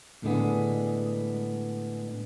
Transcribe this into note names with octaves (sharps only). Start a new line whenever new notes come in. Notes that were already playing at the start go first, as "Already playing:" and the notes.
A2 D3 G#3 B3